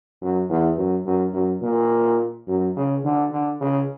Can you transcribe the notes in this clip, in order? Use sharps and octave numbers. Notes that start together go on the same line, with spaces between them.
F#2
E2
F#2
F#2
F#2
A#2
F#2
C#3
D3
D3
C#3